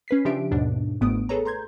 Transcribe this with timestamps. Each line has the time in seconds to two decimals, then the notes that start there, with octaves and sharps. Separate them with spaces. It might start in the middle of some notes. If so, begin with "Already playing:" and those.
0.08 C#4 B4 B6 C7
0.25 C#3 F3 D4 G4 E5 D7
0.51 D#2 G#2 B2 D4
1.01 G1 G#2 A3 B3 D#6 D7
1.29 G#4 A4 B4 C#5 A#5
1.45 A#5 C6 G6 G#6